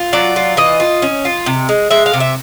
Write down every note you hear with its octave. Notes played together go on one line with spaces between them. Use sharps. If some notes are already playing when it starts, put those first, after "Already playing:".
Already playing: F4
F#3 D5
F4
E3 D#5
F4
C#4
F4
C3
G#3
G#3 E5
F5
C3
E5